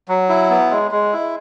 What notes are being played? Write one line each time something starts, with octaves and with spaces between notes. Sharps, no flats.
F#3
E4
B3
G#3
G#3
E4